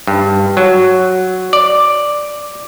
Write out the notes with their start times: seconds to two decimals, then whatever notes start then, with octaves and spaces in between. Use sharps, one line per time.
0.07 G2
0.57 F#3
1.53 D5